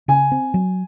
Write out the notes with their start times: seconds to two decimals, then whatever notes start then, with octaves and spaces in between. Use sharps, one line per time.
0.08 C#3 G#5
0.32 C4
0.54 F#3